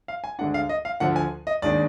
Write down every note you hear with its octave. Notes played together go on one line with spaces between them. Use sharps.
F5
G#5
D2 D3 G#3 D4 F#5
F5
D#5
F5
D2 D3 F3 F#5
G#5
D#5
D#2 D#3 G#3 D4 D5